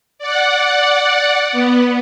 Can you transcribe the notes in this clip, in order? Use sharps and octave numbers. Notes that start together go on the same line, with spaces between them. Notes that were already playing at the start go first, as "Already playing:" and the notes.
D5 F#5
B3